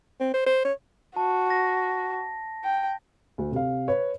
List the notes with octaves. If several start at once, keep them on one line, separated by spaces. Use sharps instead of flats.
C4
C5
C5
C#5
F#4 A5
A#6
G5
D2
C3 F5
B4 C#5